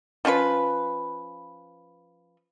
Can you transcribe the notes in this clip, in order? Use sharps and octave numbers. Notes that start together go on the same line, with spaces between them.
F3 C#4 F4 B4